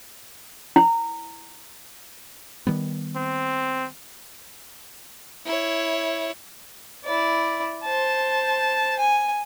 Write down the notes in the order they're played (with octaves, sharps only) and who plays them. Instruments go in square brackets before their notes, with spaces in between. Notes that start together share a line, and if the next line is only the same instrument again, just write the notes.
[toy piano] E4
[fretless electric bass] D#3 G3 B3
[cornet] C4
[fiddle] E4 C#5
E4 D5
C5 A5
G#5